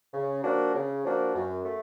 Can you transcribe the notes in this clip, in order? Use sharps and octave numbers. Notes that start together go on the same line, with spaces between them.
C#3
F3 A#3 D4 F#4
C#3
F3 A#3 D4 F#4
F#2
A3